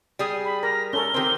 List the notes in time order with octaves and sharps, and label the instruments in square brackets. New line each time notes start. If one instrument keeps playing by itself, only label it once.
[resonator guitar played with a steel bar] G3 G#4 G#5
[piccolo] B5
[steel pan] A#4 [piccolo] A#6
[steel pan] C#4 A4 A#4 [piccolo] G7
[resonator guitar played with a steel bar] D#3 C4 [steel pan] G4 A#4 C5